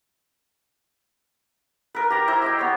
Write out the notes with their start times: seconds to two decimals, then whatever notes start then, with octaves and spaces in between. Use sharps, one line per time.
1.95 A#4 B4
2.10 G4 A#5
2.28 E4 C5 A#5
2.42 G4 D#5 G5
2.59 B3 C#5